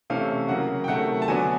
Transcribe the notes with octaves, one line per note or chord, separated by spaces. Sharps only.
C3 E3 A3 C#4 F5
C#3 F#3 A#3 F#5
G5
C3 D#3 F#3 A3 F#5
A5
D3 F#3 B3 D4 G#5